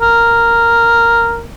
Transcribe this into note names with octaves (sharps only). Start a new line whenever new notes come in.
A#4